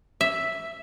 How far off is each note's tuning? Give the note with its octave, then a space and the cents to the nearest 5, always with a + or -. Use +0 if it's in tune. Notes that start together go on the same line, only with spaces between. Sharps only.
E5 +0